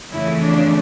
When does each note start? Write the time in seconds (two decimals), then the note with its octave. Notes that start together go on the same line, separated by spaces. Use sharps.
0.12 F2 C#3 E3 A3 E4
0.43 D4